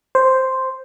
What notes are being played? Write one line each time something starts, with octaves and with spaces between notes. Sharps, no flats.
C5